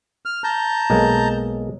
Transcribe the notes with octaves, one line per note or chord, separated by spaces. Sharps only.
F6
A5 A#5 G6
B1 G#3 A#3